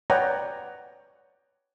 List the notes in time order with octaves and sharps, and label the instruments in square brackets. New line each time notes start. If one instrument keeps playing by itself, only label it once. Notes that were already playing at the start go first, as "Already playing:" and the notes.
[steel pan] B4 C#5 D5 F#5 G5 A#5